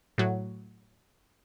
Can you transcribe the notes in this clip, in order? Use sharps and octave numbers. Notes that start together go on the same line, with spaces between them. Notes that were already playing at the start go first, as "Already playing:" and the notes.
A2 F#3